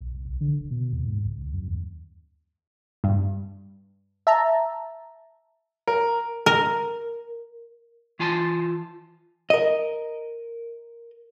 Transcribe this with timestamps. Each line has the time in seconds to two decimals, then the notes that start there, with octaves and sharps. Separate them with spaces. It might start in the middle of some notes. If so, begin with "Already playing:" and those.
0.01 B1
0.14 C2
0.25 B1
0.41 D3
0.59 D#1
0.71 B2
0.93 D#2
1.05 G#2
1.25 C#2
1.41 D2
1.53 F#2
1.68 D#2
3.04 G2
4.27 E5 A5 A#5
5.87 A#4
6.46 A#4
8.19 E3 F4 G#5 A5 C6
9.50 A#4 D#5